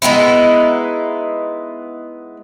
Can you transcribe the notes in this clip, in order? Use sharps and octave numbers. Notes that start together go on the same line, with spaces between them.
G#3 B3 D#4 E4